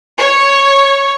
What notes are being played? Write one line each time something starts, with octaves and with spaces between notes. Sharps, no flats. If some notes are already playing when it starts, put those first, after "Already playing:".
C#5